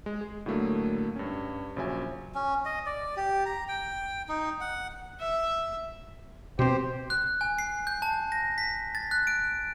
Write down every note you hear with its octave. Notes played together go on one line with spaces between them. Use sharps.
G#3
G#4
A2 D3 F#3 A3 A#3
G2 C#4
A#1 C#3 F#3 E5 G#5
C#4
D#5
D5
G4
A#5
G5
D#4
F#5
E5
B2 C4 G4 C5
F#6
G#5
C7
G6
A5
A#6
B6
A6
F#6
D7